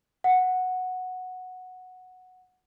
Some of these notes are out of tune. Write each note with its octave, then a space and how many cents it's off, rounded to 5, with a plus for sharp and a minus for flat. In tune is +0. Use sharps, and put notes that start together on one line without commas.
F#5 -5